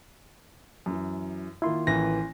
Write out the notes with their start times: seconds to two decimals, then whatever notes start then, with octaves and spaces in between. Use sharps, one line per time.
0.86 F#2 E3
1.62 D#3 A#3 E4 F4 C6
1.87 A1 E3 A#6